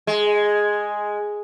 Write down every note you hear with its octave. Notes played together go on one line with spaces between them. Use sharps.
G#3